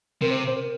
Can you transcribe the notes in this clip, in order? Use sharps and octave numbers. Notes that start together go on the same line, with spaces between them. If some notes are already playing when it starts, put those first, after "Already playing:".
C3 A#4
C5
C5
A#4